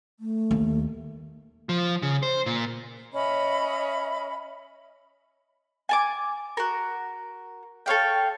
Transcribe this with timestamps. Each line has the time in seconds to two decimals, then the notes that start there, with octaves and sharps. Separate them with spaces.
0.19 A3
0.51 D#2
1.69 F3
2.02 C#3
2.23 C5
2.46 A#2
3.14 C#4 D#5 E5 B5
5.89 G#5 A5 D6
6.57 F#4 A#4
7.86 A4 C#5 F5 G5